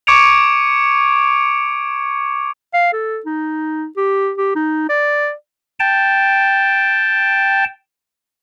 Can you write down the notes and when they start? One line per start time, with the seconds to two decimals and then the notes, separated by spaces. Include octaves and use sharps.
0.07 C#6 D6 G#6 C#7 D7 F7
2.74 F5
2.93 A4
3.26 D#4
3.97 G4
4.38 G4
4.56 D#4
4.89 D5
5.80 G5 A5